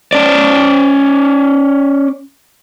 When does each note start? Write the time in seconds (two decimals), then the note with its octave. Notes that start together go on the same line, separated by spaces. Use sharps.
0.13 C#4 D5